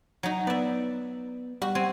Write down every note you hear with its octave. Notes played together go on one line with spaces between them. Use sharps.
F#3 D#4
B3 D5 E5
G3 F#4
C4 G#5